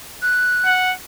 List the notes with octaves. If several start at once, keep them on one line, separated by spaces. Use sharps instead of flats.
F#6
F#5